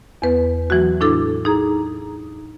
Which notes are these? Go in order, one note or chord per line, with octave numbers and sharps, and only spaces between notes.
E2 B3 B4
E3 F#3 G#3 F#4
A2 D4 E4 A4 D6
D#4 G#4 A#5